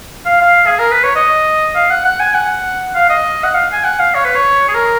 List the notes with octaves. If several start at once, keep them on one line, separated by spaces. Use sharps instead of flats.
F5
F5
G#4
A#4
B4
C#5
D#5
F5
F#5
F#5
G#5
F#5
F5
D#5
F#5
F5
G#5
F#5
F5
C#5
B4
C#5
G#4
A#4